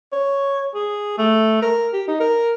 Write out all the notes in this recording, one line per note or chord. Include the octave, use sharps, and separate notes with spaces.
C#5
G#4
A3
A#4
G4
D#4
A#4